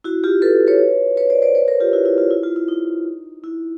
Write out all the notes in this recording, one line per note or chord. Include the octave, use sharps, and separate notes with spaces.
E4 F#4
F4 G4
A4 B4
B4 C#5
B4 C#5
C5 D5
C5 D5
B4 C#5
A#4 C5
F4 G4
E4 F#4
E4
F4
E4
F4
E4
D#4
E4